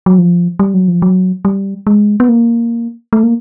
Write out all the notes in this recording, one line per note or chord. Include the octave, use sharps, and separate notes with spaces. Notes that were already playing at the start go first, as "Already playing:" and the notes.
F#3
F3
G3
F#3
F3
F#3
G3
G#3
B3
A#3
A3
A#3